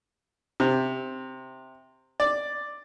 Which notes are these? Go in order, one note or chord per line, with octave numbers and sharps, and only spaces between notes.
C3
D5